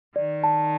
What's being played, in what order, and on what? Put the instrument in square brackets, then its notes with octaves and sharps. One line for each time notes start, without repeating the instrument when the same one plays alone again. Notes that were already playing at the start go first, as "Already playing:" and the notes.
[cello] D#3 [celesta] D5
[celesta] A5